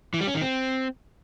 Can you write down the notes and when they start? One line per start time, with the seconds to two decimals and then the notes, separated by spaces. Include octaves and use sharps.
0.14 E3
0.21 G3
0.28 C#4
0.34 D#3
0.41 C4